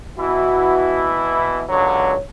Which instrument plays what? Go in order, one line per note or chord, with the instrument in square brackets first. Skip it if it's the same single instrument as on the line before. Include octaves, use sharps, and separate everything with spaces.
[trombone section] B2 E3 E4 [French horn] F#4
[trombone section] C#2 D3 F#3 [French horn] C#5